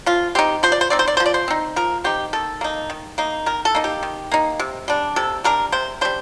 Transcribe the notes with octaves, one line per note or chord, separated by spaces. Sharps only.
F3 F4
C4 D#4 G4
F3 C5
D5
C5
C4 D#4 D5
C5
D5
F3 C5
D5
C5
C4 D#4
F3 A#4
C4 D#4 G4
D#3 A4
A#3 D#4
D#3
A#3 D#4
D#3 A#4
A4
A#3 D#4
G4
D#3
A#3 D#4
C3
G3 D4
C3 A4
G3 D4 A#4
C3 C5
G3 D4 C5